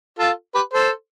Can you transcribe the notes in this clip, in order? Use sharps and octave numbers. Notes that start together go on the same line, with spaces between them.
F4 A4
G4 B4
A4 C5